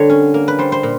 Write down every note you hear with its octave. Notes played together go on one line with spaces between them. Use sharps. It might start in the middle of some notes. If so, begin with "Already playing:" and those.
Already playing: D3 G3 A#3 C#5
C#4
A#3
B4
G3 C5
C5
A#2